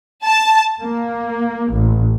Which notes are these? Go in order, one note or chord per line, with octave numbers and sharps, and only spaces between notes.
A5
A#3
A1